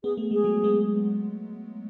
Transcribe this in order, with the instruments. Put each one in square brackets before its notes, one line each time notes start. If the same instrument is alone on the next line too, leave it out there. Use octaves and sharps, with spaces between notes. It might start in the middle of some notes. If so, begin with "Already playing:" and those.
[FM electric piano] B3 [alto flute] G#4
[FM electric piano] A3
[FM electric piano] G#3 [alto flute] G#4
[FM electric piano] F#3 A3
G#3 B3